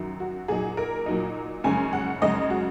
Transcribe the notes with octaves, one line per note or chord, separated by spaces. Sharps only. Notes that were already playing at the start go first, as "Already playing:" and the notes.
Already playing: F#2 D#3 F#3
F#4
A#2 F#3 D#4 G#4
A#4
A#2 F#3 D#4
F#2 C#3 G#3 C#4 G#5
F#5
F#2 C#3 G#3 C#4 D#5
F#4